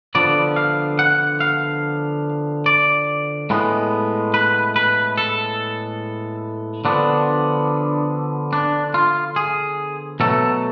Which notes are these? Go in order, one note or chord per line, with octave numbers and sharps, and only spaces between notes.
D3 F3 B3 D5
F5
F#5
F5
D5
A2 G#3 B3
B4
B4
A4
D3 F3 B3 D4
D4
F4
G#4
B2 F#3 A3 A4